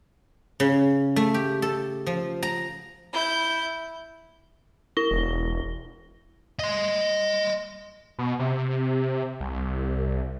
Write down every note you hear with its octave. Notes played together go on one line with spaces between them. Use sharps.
C#3
A3
G4
A4
F3
A#5
E4 G6
E4 A#6 G7
E1
D#5 C6
B2
C3
C2